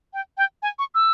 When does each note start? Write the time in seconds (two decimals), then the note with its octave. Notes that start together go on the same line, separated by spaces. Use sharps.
0.14 G5
0.37 G5
0.62 G#5
0.79 C#6
0.95 E6